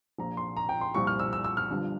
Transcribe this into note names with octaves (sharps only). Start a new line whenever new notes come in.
A#1 A#2 F3 A#5
C6
A#5
G5
C6
C2 A#2 F3 C#6
F6
E6
E6
E6
F6
G1 G2 F3